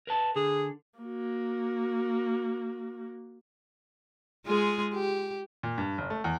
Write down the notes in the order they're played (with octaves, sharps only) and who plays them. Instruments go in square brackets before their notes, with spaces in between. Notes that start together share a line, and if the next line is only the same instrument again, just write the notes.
[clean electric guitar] A#4 B4 A5
[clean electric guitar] D3 [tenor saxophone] G#4
[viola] A#3 F#4
[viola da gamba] G#3 F4 G#4
G4
[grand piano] A#2
G2
F#1
A3
E2